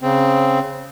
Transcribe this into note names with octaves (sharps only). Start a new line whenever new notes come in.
C#3 C4